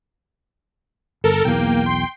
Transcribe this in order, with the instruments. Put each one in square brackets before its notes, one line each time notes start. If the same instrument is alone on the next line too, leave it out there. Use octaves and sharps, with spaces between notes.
[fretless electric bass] G1 [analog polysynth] A4 A#4
[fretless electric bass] B1 E2 [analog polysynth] A#3 G5
[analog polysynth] G5 C6